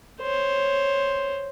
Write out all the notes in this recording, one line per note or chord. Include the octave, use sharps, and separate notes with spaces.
C5 C#5